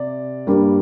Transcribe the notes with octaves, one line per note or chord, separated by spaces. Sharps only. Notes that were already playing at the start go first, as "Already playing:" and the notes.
Already playing: C3 D5
G2 G3 A#3